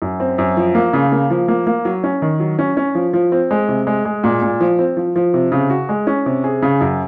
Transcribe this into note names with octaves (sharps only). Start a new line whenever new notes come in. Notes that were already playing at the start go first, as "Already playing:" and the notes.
F#2
C4
F#2
F3
A#3
C#3
A#3
F3
A#3
A#3
F#3
C#4
D#3
F#3
C#4
C#4
F3
F3
C4
G#3
C3
G#3
G#3
A#2
A#2
F3
C4
F3
F3
C3
C#3
F#4
G#3
C#4
C3
G#4
C#3
F#2